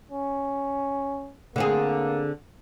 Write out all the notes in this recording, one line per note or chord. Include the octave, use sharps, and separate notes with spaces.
C#4
D3 A#3 C4 G#4